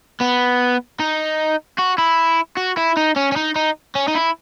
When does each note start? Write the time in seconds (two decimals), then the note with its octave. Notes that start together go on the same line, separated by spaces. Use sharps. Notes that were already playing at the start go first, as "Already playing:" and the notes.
0.20 B3
1.00 D#4
1.78 F#4
1.98 E4
2.57 F#4
2.77 E4
2.97 D#4
3.16 C#4
3.32 C#4
3.36 D#4
3.56 D#4
3.95 C#4
4.08 D#4
4.15 E4